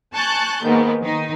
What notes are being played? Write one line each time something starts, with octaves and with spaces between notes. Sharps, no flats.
G#5 A5 C#6 F#6 G6 A6
G#2 D#3 A#3 B3
D#3 D#4